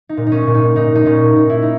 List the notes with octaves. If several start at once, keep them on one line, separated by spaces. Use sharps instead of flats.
D#4
A#2
D#4
C#4
A#2
D#4
A#2 D#4
D#4
A#2 C#4
A#2 D#4
E4
D#4